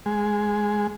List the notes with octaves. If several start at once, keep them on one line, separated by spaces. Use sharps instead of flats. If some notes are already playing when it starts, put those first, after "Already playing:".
G#3